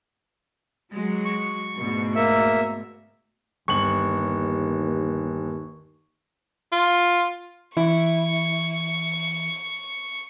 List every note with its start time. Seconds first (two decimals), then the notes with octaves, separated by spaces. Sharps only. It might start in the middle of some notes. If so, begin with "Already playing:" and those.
0.92 F#3 G#3 F#4
1.25 C#6
1.77 D2 G#2 B2
2.15 A#3 E5
3.68 G1 D#2 C#6 F#7
6.72 F4
7.77 E3 E4 C#6